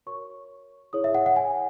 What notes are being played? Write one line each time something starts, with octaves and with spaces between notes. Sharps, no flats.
F#4 A#4 C#5 C#6
E4 G#4 C#5 D#6
E5
F#5
F#5
G#5